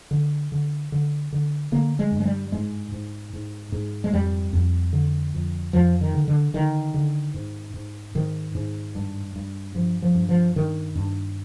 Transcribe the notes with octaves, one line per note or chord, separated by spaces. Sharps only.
D3
D3
D3
D3
D3 A#3
G#3
G2
G#3
G3
G#2 G#3
G#2
G#2
G#2
G#3
F2 G3
F2
D3
F2
F2 F3
D#3
D3
D3
D3 D#3
D3
G#2
G#2
G#2 D#3
G#2
G2
G2
G2 F3
F3
G2
F3
G2 D#3
G2